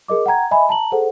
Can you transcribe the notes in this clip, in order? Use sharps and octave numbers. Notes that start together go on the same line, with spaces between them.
G#4 A#4 D#5 D6
F#5 G5 A#5 G#6
D#5 E5 G#5 B5
A5 A#5 F#7
G#4 A4 C5 F#5